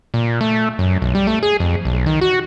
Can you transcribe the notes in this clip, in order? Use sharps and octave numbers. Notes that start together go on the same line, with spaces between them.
A#2
A3
F#2
B1
G3
A3
G#4
F2
B1
D#3
F#4